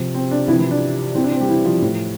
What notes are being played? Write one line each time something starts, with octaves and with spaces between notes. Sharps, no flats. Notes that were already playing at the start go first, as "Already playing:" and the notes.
Already playing: C3 F3
C4
D4
C3 E3 F3 E4
E3 E4
D4
C3 E3 C4
D4
C4
G3 G4
E3 E4
F3 F4
A2 F3